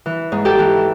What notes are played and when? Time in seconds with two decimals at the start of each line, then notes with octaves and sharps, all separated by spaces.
0.06 E3
0.32 G#2
0.45 G4 A4
0.59 E3